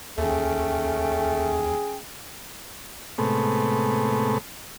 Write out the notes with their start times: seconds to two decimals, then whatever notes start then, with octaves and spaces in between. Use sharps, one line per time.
0.18 D#2 A3 C#4 G#4 G5
3.18 A2 C3 G#3 A3 B3